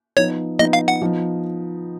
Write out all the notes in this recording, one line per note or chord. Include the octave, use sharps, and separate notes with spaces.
F3 B3 D#4 C#5
F3 B3 D#4 D#5
F5
F#5
F3 B3 D#4